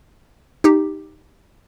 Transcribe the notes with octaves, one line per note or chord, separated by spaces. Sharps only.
D#4 G4